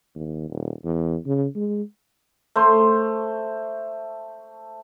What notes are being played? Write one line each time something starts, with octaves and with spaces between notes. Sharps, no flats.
D#2
D#1
E2
C#3
G#3
A3 C5 C6